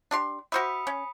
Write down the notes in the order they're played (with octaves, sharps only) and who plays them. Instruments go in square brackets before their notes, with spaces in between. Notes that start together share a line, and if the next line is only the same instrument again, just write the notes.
[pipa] D4 G4 C6
[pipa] F#4 C5 E5 [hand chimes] B5 D#6 C#7
[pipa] C#4